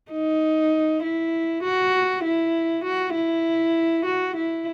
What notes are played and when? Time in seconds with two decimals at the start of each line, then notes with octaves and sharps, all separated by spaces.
0.12 D#4
1.03 E4
1.63 F#4
2.24 E4
2.84 F#4
3.15 E4
4.05 F#4
4.36 E4